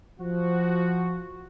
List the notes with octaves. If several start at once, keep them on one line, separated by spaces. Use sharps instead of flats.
F3 F#4